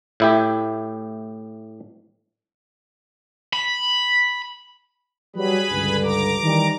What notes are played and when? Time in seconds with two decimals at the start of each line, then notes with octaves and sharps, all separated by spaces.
0.20 A2 E4 G4
3.53 B5
5.36 F#3 G3 G#4 B4 B5
5.70 C#2 G2 D3
6.03 A#5 D6
6.42 D#3 E3 G3